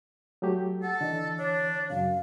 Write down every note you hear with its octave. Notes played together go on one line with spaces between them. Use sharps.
F#3 A3 G4
A4 F#5
D3 E3 D#5
D4 C#5
F#2 C#3 F5